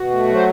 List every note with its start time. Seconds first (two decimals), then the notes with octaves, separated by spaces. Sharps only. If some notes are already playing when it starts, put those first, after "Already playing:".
Already playing: B2 F#4
0.10 A3
0.28 F#3
0.34 C5